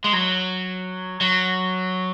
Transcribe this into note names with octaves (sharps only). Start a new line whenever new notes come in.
G#3
F#3
F#3